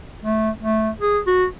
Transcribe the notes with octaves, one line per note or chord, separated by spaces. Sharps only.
A3
A3
G#4
F#4